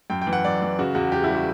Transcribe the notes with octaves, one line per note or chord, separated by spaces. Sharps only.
F#2 G5
G5
E3
F#5
F#2 D5
E3
C#3 F#4
E2 F#4
E2 G4
E4
G3
F#4